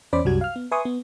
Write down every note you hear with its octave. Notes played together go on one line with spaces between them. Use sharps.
E2 C#4 C5 D5 B5 D6
C2 F#2 F#3 G3 F#4 G#6
F5 F6
B3
B4 E5 G#5 C6 C#6 D#6
B3